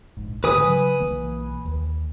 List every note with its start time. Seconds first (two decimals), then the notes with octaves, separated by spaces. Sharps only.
0.17 A#1 G#2
0.44 G#2 D3 E3 B4 G#5 D#6
0.64 C#3 F#3
1.00 B1 E3 A#3
1.65 D#2